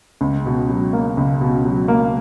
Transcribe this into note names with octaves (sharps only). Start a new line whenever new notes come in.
C#2
B2
F#3
A#3
C#2
B2
F#3
A#3